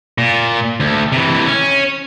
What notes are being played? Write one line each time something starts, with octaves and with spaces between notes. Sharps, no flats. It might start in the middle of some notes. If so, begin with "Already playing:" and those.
A#2
D2
C3 E3
C#4